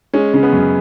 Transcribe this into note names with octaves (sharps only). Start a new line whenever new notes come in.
G#3 C#4
C#3 C#4
B3
F#2